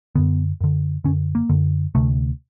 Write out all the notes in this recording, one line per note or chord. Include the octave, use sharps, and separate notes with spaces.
F#2 D3 B3
F#2 D3
F#2 D3 C#4
A#3
F#2 D3
D2 C3 A3